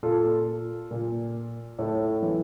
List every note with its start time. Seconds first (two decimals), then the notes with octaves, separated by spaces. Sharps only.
0.03 A#2 F4 A4
0.91 A#2
1.78 A2 A4 C#5
2.22 E3